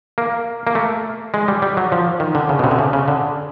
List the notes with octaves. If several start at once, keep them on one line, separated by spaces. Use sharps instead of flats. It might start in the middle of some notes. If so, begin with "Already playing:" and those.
A#3
A#3
A3
G#3
G3
G3
F#3
F3
D#3
D3
C#3
B2
C3
D3
C#3
C#3
D3